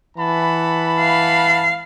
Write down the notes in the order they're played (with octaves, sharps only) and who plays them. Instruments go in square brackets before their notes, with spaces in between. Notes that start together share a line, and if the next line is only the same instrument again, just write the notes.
[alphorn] E3 [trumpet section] F#5 A5 B5
[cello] F5